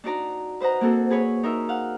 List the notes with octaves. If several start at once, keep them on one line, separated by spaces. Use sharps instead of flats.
D4 D#4 F#4 D5 A#5
B4 C5 D#5 F#5 A#5
A#3 C4 F#4 A4
G#4 B4 C#5
D#4 A#4 E5
F5 F#5